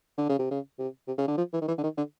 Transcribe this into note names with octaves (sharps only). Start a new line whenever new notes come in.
D3
C#3
C3
C#3
C3
C3
C#3
D3
F3
E3
D#3
E3
D3
D#3
D3